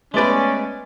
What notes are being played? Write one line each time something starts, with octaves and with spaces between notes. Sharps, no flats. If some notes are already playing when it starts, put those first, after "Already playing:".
G#3 A3 B3 C#4 B4 D5